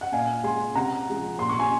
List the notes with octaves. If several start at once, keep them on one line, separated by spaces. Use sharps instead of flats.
F#5
A#2 F5 G#5
G#3 G#5 C6
C3 F#5 A#5
F3 G#3
A#2 C6
C#6
G#5 C6